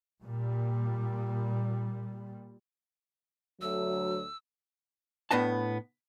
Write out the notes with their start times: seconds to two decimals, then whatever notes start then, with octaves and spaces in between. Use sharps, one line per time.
0.22 A#2 G3
3.61 D2 F#3 A3 E6
5.31 A2 B3 D4 D#5 A5